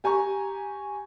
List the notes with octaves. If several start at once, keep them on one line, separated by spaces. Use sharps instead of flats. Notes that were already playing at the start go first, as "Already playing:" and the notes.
G4 G#5 A#5 C#6